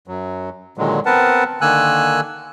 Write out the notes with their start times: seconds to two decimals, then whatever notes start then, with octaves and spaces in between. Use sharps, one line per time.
0.08 F#2 F#3
0.78 A#2 D3 D#3 F#3 G#3
1.06 B3 C4 A#4 B4 F#5 A5
1.61 D3 D#3 A#3 G#5 E6 F#6